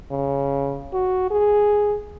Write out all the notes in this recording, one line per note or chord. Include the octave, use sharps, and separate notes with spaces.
C#3
F#4
G#4